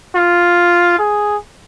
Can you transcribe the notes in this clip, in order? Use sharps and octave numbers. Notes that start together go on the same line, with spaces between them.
F4
G#4